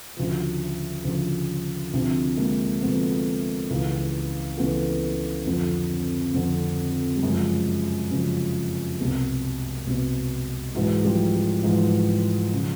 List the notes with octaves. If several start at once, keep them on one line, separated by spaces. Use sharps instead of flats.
D2 C#3 F3
D2 C#3 F3
D2 C3 F3
G#3 A#3
D2 C3 F3 A3 B3
C#2 C#3 E3
C#2 C#3 E3 A3 B3
F2 D3 F3
F2 D3 F3
G3
F#2 C#3 F3 F#3 G#3
F#2 C#3 F3
C2 B2
C2 B2
G#2 E3 F#3 G#3
F3 G3
F#3
G#2 E3 F3
C#3 F3